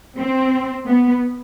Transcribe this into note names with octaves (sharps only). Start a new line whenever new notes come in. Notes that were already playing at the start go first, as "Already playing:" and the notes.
C4
B3